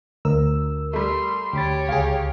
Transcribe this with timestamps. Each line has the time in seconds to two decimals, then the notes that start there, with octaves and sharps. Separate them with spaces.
0.25 D2 A#4 E6
0.93 G3 A3 C6
1.53 D2 G4 C#5 B5 A6
1.89 C#2 G#4 F5 G5